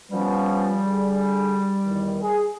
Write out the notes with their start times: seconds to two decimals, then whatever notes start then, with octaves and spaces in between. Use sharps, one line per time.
0.11 F3 G3 B3 C#4
0.84 D3 G#4
1.85 E2 D#3
2.20 G#4